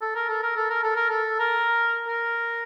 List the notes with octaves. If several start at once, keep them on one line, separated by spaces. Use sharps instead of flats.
A4
A#4
A4
A#4
A4
A#4
A4
A#4
A4
A#4
A#4